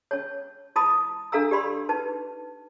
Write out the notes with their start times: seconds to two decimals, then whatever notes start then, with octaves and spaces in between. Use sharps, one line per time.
0.11 C#4 C#5
0.76 E4 A5 B5 D#6
1.32 D4 A4 F5 A#5 E6
1.51 G4 D5 B5 C6
1.89 D#4 B4 A5